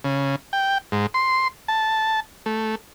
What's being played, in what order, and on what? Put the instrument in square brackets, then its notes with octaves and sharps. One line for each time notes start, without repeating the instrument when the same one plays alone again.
[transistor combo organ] C#3
G5
G#2
C6
A5
A3